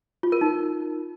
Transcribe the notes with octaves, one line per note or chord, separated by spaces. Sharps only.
F4
A#4
D#4